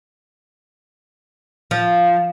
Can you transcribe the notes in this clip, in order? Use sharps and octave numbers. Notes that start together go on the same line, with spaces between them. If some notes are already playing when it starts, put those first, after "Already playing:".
F3